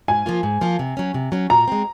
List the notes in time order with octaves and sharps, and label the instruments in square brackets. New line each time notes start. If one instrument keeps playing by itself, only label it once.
[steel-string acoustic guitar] G#2 [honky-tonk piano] G#5
[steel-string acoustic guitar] F3 A#3 F4
G#2
F3 A#3 F4
C3
F#3 C#4
C3
F#3 C#4
[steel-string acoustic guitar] A#2 [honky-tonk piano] A#5
[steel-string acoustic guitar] G#3 C4